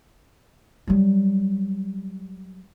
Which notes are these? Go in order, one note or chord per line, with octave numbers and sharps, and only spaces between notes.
F#3 G3